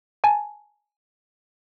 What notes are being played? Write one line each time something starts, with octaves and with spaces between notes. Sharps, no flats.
G#5 A5